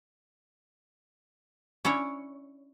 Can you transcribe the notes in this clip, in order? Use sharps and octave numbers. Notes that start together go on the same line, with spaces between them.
C#4 D4 E4 C#5